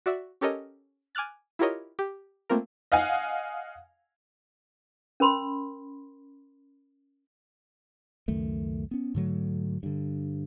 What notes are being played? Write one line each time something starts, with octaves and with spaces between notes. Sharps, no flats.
F#4 D5 E5
C#4 G4 A4 A#4 C#5 D#5
G#5 D6 F6 F#6 A6
E4 F4 G4 A#4 C#5 D#5
G4
A3 A#3 C4 F4 A#4
D#5 F5 F#5 G#5
C#4 A#4 B5 C6
C#2 F#2 D#3 A3
B3 C#4
G#2 D3 F#3 A3
G2 D3